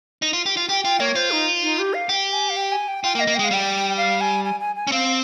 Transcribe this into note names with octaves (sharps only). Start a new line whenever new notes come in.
D#4
F4
G4
F4
G4 G5
F4 G5
A#3 C#5
F4 C5
D#4
D#4
G4
F5
G4 G5
G#5
F5
G5
G#5
G5
F4 G5
A#3
D#5
A#3
G#3 G5
F5
G3 G5
F5
G#5
G#5
G#5
G#5
C#4
C4 F5